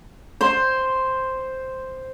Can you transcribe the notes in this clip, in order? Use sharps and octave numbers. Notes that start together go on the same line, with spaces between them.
C5 C6